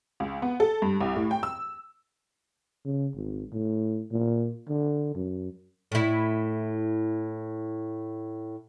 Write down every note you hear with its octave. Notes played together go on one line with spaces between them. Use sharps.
C#2
B3
A4
G2
C2
A2
G5
E6
C#3
G#1
A2
A#2
D3
F#2
A2 E4